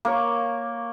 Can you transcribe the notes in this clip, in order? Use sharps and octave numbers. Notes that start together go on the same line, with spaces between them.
A#3 A#4 C#5